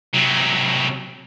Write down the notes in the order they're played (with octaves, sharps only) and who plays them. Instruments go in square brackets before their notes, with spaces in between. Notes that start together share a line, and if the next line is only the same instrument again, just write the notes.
[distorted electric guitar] C3 F#3